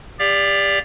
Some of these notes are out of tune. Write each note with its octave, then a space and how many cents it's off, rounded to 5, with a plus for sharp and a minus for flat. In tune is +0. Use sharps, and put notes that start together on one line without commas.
G4 +30 D5 -10 F5 +0